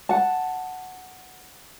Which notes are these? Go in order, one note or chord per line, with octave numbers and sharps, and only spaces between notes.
F#5 A5